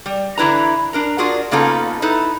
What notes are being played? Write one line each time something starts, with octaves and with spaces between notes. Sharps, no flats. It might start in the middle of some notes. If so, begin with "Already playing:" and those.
G3
D3 E3 E4 B4 A#5
D4 A#4 A#5
D4 F4 F#4 G#4 A#4
C#3 A#3 B3 D#4 F4 A4
D#4 E4 A4 B4